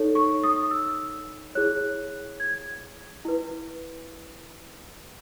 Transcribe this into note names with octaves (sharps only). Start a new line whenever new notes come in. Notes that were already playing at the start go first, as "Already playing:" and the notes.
Already playing: D#4 A4 C#5
C#6
D#6
E6
E4 G#4 C#5 F#6
G#6
E4 B4